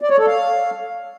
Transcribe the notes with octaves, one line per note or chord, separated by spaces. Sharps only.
D5
C#5
A4
F5